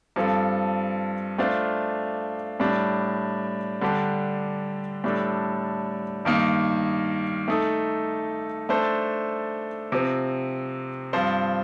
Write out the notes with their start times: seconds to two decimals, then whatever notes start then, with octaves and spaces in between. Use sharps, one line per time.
0.16 G2 F3 C4 F4 A4
1.38 A3 D4 F4 C5 F5
2.60 A2 G3 D4
3.81 D3 G3 D4 G4
5.04 A2 G3 D4 A4
6.25 G2 D#3 A#3 D#4
7.48 A3 D#4 A4
8.69 A3 D4 A4 C5
9.92 C3 F3 C4
11.13 G2 F3 C4 F4 C5